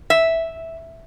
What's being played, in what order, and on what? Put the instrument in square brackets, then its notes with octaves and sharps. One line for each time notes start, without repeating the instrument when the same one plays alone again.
[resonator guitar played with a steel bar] E5